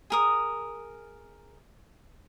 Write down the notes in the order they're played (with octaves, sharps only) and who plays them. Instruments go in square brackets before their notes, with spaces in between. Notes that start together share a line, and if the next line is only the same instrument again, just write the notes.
[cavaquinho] G#4 A#4 D#6